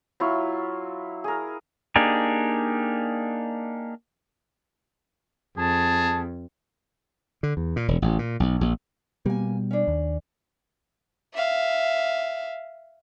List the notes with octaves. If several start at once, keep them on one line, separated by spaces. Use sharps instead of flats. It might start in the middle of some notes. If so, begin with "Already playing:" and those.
F#3 E4 F4 C#6
G#4 A#4
A#3 D4 D#4 G4 G#4
F2 G#4 A5
D3
E2
A#2
E1
A1
A#2
B1
A#1
B2 G3 A#3 G#5
C#4 D4
D#2
E5 F5